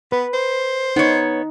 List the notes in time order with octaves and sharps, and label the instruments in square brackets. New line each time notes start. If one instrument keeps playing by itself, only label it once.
[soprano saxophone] B3 [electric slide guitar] B4
[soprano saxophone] C5
[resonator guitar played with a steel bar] B3 C#5 [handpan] D#4